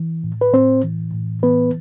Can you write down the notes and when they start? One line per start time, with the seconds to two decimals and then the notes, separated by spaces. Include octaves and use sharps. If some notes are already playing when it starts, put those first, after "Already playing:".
Already playing: E3
0.24 A2
0.41 B4
0.53 A2 C4 C5
0.83 E3
1.14 A2
1.42 E3 B3 B4